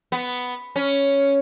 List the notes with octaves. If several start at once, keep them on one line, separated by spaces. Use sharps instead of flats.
B3
C#4